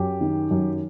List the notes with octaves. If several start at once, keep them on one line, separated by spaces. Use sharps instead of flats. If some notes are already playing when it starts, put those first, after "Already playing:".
Already playing: F#2 G4
D#3
F#2